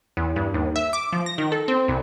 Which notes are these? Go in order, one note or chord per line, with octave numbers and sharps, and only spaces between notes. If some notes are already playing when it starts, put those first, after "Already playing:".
E2
G2
D#2
E5
D6
F3
A#6
D#3
A4
C4
C2